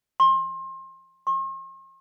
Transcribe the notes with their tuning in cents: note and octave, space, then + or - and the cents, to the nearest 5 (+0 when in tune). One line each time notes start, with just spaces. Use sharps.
C6 +30
C6 +45